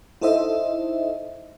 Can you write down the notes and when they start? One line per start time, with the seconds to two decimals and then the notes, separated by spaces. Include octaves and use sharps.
0.21 D#4 E4 A4 C5 D#5 E5